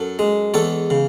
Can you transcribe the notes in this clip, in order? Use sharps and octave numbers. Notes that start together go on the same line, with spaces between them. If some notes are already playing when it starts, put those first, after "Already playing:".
Already playing: F#2 A4
G#3
E2 A4 C#5
C#3